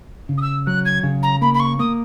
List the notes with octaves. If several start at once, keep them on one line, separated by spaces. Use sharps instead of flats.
C#3
D#6
E6
F#3 F#6
G#6
C#3
A#5
A#3 B5
B5
C#6
A#3 D#6